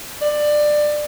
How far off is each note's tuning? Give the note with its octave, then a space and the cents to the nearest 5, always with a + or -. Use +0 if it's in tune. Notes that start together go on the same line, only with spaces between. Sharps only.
D5 +20